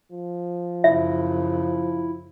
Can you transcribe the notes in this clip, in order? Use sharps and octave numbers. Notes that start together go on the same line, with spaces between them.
F3
F#2 C#3 E4 E5